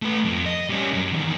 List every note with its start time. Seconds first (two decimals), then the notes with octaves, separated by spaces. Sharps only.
0.02 A3 B4
0.25 F2
0.46 D#5
0.70 G3 C#4
0.94 F#2
1.13 E2 D#3